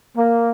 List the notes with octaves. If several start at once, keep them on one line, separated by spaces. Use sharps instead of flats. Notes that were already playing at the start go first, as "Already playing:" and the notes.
A#3